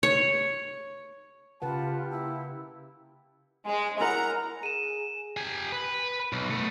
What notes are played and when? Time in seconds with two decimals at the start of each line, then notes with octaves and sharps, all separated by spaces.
0.03 C#5
1.62 C#3 F4 G4 B4 F#5 A5
2.11 A#3 E4
3.66 G#3
4.00 E4 A#4 F#5 A#5
4.63 G#4 D#7 E7
5.37 G4 G#5
5.72 B4
6.33 B1
6.50 A3 B3